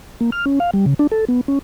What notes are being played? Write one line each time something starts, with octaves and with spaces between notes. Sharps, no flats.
A#3
F6
C#4
F5
G3
C#3
D4
A4
B3
C#4